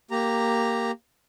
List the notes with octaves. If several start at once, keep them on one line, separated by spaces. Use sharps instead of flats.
A#3 G4 A#5